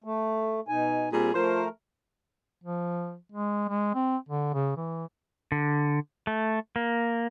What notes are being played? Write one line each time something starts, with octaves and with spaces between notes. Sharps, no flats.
A3
B2 D#4 G#5
A#2 G3 C4 G#4
F3 A3 A#4 C5
F3
G#3
G#3
C4
D3
C#3
E3
D3
A3
A#3